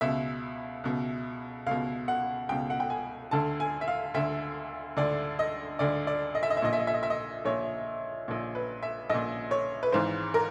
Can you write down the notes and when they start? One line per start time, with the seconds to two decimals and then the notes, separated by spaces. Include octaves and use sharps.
0.01 C#2 B2 E5
0.84 C#2 B2
1.66 C#2 B2 F5
2.08 F#5
2.49 C#2 B2 G5
2.70 F#5
2.80 G5
2.90 G#5
3.31 D2 D3 A5
3.60 G#5
3.81 E5
3.88 F5
4.14 D2 D3 E5
4.97 D2 D3 D5
5.39 D#5
5.79 D2 D3 D5
6.07 D5
6.35 D#5
6.43 E5
6.50 D#5
6.57 E5
6.62 A#1 A#2 D#5
6.73 E5
6.79 D#5
6.87 E5
6.94 D#5
7.03 E5
7.10 D#5
7.45 A#1 A#2 C#5
8.28 A#1 A#2
8.55 B4
8.83 E5
9.10 A#1 A#2 D#5
9.51 C#5
9.83 B4
9.92 G#1 G#2 E3 C5
10.34 A#4